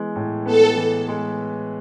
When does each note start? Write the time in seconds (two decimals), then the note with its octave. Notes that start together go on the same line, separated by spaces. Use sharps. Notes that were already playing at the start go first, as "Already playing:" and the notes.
Already playing: E3 G#3 B3
0.16 A2
0.46 B3 A4
0.76 E3
1.08 G#3